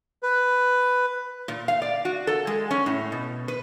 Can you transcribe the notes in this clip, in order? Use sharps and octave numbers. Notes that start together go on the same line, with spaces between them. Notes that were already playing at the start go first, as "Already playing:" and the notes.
B4
A#2
F5
D5
F#4
A4
G#3
C#4
A2
B2
B4